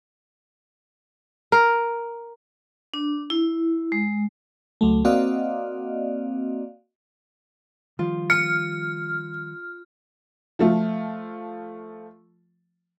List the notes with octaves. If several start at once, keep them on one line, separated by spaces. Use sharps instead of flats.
A#4
D4
E4
G#3
C#2 F#3 A3
A#3 C4 F#4 D5 D#5 F5
D#3 F3 G3 F4
F6 C#7
F3 A3 F4